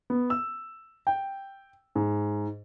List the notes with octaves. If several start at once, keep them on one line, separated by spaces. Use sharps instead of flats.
B3
E6
G5
G#2